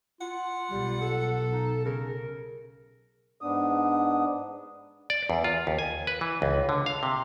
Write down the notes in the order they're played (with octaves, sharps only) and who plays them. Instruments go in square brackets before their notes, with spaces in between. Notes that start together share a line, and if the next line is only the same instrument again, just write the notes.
[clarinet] F4 [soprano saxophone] F#5
[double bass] B1 [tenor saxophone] G3
[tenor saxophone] A4
[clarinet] D#4
[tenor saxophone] C#3 [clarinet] A#4
[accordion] G#2 B3 D4 D#6
[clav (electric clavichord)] D5
E2
F4
D#2
G#5
B4
E3
C#2
D3
F5
C3